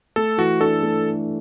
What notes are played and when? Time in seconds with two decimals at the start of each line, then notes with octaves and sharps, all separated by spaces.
0.16 A3 A4
0.38 E3 F#4
0.61 D4 A4
0.83 A3